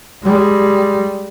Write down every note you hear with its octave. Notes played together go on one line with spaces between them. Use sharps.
G3 G#3